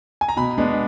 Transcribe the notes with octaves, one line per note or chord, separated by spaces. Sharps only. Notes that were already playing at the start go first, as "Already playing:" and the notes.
G#5
A#5
B2 B5
G#3 B3 D4